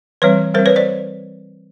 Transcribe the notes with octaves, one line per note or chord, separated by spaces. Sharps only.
E3 G3 C4 B4 C#5
G3 C4 A#4 C5
B4 C#5
C5 D5